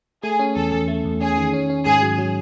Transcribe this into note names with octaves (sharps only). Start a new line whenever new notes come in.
A3 G#4
C#4
E2 A4
E2
A3
E2
C#4 G#4
D#3
C#4
C#4
G#2 G#4
F#3
F#3